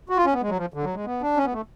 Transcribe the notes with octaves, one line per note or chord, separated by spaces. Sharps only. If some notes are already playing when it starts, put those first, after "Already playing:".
F#4
F4
C#4
B3
G#3
F#3
F3
D3
F#3
G#3
B3
D4
C#4
B3
A3